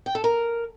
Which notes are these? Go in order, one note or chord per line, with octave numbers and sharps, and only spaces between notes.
G5
A4
A#4